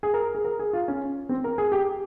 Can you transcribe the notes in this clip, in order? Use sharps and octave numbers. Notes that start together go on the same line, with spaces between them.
G#4
A#4
G#4
A#4
G#4
F4
C#4
C4
A#4
G#4
G4